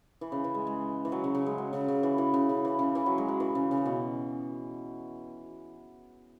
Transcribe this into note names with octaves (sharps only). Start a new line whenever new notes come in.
E3
C#3
E3
G#3
G#3
E3
F#3
C#3
C#3
G#3
F#3
C#3
C#3
E3
E3
C#3
C#3
E3
C#3
E3
F#3
G#3
F#3
E3
C#3
C#3
B2